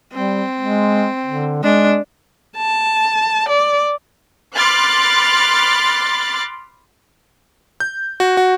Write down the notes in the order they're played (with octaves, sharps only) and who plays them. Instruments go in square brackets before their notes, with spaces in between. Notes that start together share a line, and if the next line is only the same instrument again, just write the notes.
[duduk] G3 [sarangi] C4
[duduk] G#3
D3
[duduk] G#3 [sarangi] D4
[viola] A5
D5
[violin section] B5 C6 D6 F6 F#6 A6
[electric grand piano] G6
F#4
F#4